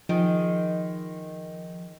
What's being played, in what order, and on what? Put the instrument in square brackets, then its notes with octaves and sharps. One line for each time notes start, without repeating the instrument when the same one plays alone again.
[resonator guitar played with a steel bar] D#3 G#3 [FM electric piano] F3